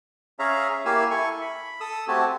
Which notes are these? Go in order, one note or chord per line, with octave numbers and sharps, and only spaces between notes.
C#4 G#4 C#5 E5 F5 A#5
A#3 E4 G4 F5 G#5 E6
E4 A4 G#5 C#6
B5
A4 D#6 E6
A3 C4 F#4 G4 G#5 A5